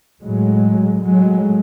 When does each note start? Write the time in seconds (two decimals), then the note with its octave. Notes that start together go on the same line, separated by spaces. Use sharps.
0.22 A2 F#3 G#3
1.04 A2 F#3 G#3